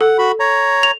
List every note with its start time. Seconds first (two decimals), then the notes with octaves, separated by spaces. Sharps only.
0.01 A4 F#5
0.18 F#4 B5
0.40 C#5 A#5
0.83 F7